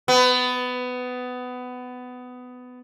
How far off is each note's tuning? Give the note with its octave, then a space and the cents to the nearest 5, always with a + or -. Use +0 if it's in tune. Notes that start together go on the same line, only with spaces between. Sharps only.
B3 +20